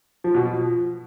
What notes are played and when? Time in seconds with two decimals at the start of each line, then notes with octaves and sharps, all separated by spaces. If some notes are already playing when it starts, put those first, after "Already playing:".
0.24 F3
0.35 B2
0.45 F3